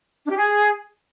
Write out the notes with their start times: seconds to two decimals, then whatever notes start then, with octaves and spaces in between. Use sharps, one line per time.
0.25 D4
0.31 G4
0.37 G#4